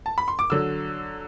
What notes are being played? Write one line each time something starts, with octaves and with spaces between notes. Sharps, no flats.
A5
B5
C6
D6
D3 F#3 E6